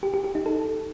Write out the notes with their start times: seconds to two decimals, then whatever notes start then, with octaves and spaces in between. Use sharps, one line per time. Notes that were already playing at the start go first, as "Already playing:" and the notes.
0.03 G4
0.14 G4
0.24 G4
0.35 D#4
0.46 A4